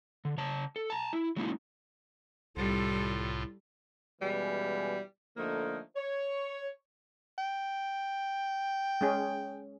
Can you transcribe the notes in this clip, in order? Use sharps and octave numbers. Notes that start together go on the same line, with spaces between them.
D3
C#3 C#5 A5
A4
A5 A#5
E4
F#3 G#3 A#3 C#4 D#4 E4
C2 A2 G3 F4 A4
B2 E3 G3 G#3 C#4
D3 F3 A3 A#3 D#4
C#5
G5
G#3 C#4 G#4